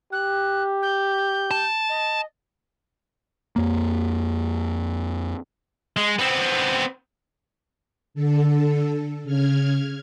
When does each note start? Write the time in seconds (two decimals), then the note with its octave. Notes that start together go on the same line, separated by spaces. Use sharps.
0.12 G4 F#6
0.82 G6
1.51 A5
1.89 D#5
3.56 F2 A#3
5.97 G#3
6.19 B3 C4
8.14 D3 A4
9.24 C#3 F6 G#6